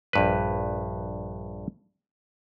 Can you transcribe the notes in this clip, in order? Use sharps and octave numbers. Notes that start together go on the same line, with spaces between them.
A#1 G2 B4